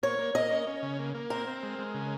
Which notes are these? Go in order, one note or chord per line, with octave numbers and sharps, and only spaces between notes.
A#3 C#5
A#3
A#3 D#5
C#4
C#4
C#3
A#3
A#3
C4 A#4
C4
G#3
G#3
C#3